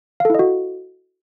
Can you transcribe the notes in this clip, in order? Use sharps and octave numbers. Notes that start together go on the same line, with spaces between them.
E4 F#4 A4 D#5 F5